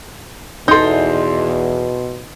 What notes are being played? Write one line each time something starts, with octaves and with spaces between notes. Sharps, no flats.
E2 B2 D#4 A4 C6 G6